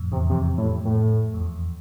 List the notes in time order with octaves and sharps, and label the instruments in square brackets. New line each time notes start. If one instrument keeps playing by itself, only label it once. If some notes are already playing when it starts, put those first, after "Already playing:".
Already playing: [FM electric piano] F2 A2
[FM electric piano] E2 [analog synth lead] C3
[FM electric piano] F2 [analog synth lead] C3
[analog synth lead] A2
A2
[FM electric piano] F2
E2